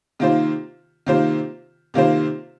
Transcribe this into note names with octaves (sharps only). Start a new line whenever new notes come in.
C3 D#3 A#3 F4 C5
C3 D#3 A#3 F4 C5
C3 D#3 A#3 F4 C5